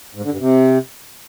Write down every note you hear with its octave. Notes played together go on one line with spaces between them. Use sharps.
G#2
D3
G2
C3